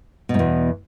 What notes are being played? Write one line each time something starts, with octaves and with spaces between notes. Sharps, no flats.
E2 G#2 B2